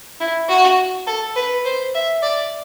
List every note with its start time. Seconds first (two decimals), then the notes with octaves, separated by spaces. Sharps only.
0.20 E4
0.49 F#4
1.07 A4
1.36 B4
1.65 C5
1.95 E5
2.22 D5